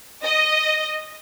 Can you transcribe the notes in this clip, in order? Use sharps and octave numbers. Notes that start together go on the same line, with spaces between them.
D#5